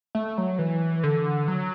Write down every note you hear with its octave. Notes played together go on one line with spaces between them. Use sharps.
A3
F#3
E3
D3
F#3